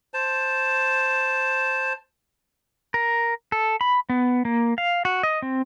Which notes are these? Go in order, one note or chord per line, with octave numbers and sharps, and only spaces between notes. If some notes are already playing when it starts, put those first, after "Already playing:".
C5 A5
A#4
A4
B5
B3
A#3
F5
F#4
D#5
C4